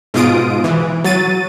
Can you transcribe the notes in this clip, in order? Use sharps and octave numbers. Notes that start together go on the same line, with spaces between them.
G#2 B2 F4 D#6 D7
E3
F#3 A6 D#7